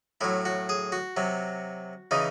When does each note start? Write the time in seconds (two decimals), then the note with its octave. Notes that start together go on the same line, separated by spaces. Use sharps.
0.21 A2 F#3 E4
0.45 F#4
0.69 G#4
0.92 F#4
1.17 C3 F#3
2.11 C#3 E3 D#4